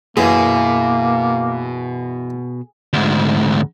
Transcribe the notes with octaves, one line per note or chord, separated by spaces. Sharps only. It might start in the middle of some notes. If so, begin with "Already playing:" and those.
F#2 B2 E3 A#3 G#4
D2 G#2